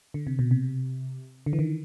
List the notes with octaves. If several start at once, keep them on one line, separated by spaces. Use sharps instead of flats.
D3
C3
B2
C3
D3
E3
D#3